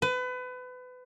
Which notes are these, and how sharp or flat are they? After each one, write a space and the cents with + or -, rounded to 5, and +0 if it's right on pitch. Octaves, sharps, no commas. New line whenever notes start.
B4 +30